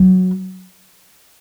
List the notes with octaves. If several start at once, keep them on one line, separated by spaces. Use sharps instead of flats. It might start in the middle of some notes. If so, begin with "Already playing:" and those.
Already playing: F#3